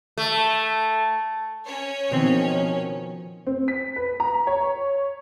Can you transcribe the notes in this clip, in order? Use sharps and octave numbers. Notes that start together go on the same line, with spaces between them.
A3
C#4 C#5
B2 D#3 F3 C4
C4
B6
B4
A#5
C#5